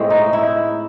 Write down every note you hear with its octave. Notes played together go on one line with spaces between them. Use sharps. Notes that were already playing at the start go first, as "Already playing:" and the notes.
Already playing: A2 G#3 C4
D#4
E4